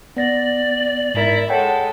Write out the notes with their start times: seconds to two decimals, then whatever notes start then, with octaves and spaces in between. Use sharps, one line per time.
0.17 B3 D5 A#6
1.14 G#2 E4 A#4
1.50 G#3 A4 C#5 F#5 G5